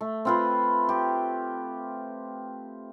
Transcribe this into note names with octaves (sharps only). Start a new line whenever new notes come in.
A3
C4 F4 B4
G4